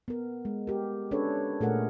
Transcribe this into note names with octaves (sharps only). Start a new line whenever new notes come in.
B3 A#4
G#3
G4 A#4
C#4 D4 G#4 A4 B4 C#5
A#2 A3 G#4 A#4 F#5